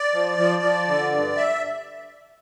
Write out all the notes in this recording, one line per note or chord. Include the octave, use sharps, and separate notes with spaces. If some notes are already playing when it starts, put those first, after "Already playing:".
Already playing: D5
F3
F3
F3
D3
G2
E5